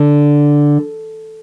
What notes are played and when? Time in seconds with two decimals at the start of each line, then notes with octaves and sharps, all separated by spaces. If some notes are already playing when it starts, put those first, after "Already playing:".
Already playing: D3